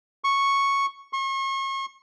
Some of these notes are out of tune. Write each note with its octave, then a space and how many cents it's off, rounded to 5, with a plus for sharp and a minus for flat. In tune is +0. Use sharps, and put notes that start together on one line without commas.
C#6 -5
C#6 -40